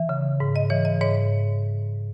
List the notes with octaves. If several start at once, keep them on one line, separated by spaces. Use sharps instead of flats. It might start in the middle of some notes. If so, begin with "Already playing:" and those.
Already playing: E3 E5
C#3
G#2
D#5
E3 C#5
D#5
G#2 C#5